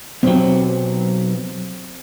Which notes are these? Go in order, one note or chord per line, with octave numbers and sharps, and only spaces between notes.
B1 F#3 C4